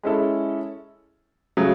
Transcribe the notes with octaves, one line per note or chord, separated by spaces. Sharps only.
G#3 C#4 E4 A4
C#3 F#3 A3